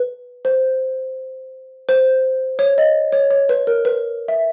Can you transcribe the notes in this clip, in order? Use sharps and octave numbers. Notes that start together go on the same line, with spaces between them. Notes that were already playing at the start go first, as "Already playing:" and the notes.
Already playing: B4
C5
C5
C#5
D#5
C#5
C#5
B4
A#4
B4
E5